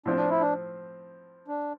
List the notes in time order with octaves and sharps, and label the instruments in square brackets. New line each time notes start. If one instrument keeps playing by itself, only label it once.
[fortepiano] A2 F3 C4 [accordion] D4
[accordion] D4
E4
D4
D4